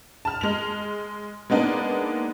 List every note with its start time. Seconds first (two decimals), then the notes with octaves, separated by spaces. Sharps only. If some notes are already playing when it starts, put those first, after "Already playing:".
0.25 A5 F6
0.41 G#3 F7
1.50 G#3 A#3 B3 D4 D#4